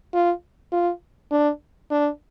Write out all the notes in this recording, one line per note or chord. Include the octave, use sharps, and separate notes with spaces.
F4
F4
D4
D4